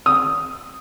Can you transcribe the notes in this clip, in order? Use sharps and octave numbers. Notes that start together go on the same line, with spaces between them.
D#6